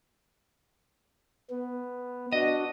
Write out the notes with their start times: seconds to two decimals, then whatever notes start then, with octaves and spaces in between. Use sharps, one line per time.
1.50 B3
2.33 D4 F#4 D#5